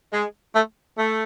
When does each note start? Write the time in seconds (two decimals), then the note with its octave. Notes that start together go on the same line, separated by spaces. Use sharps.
0.11 G#3
0.54 A3
0.98 A3